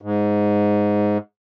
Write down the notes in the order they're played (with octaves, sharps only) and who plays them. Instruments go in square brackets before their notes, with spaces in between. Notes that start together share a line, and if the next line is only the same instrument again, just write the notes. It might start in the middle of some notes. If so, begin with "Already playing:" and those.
[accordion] G#2